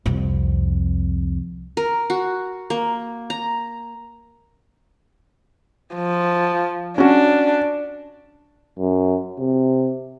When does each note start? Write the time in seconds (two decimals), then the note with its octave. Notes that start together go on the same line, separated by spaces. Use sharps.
0.06 C2 F2
1.77 A#4
2.10 F#4
2.70 A#3
3.30 A#5
5.95 F3
6.98 C#4 D4 F#4
8.79 F#2
9.39 C3